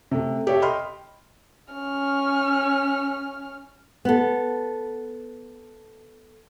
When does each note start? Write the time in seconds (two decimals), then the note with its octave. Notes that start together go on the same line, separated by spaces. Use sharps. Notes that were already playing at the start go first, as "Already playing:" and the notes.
0.11 C3 A3
0.47 G4 A4 C#5 E5
0.62 D#5 G5 B5 C6 F6
1.74 C#4 F6
4.05 B3 A4